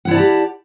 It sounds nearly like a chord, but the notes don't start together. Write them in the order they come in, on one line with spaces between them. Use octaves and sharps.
F#5 E4 D5 A5 G4